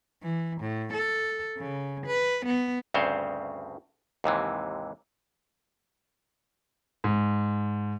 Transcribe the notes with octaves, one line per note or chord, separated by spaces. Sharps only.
E3
A2
A4
C#3
B4
B3
D2 G2 C#3 C4 C5 C#5
D#2 G#2 C3 E3
G#2